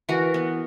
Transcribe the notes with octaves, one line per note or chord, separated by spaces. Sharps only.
E3 F#4 A#4
B3